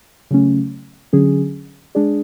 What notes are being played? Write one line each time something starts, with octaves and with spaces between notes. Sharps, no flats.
C#3 F#3 A3 C#4
D3 F#3 C#4 G#4
G#3 D4 G#4 D5